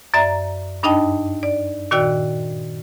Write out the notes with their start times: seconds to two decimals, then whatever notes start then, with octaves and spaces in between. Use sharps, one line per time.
0.14 F#2 D5 E5 A#5
0.83 G2 D4 D#4 D#5 G5 A5
1.43 D5
1.91 A#2 D#3 F#4 D5 G5 E6